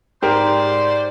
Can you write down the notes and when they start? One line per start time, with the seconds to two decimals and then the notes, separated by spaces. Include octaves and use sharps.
0.22 G#2 G4 A#4 C5 D5 C6